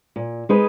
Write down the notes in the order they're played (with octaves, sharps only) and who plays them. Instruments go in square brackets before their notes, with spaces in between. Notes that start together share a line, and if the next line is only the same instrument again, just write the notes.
[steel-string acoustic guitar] A#2
G#3 D#4 G#4 B4